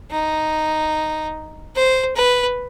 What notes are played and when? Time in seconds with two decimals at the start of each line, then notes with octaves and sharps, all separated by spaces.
0.11 D#4
1.75 C5
2.16 B4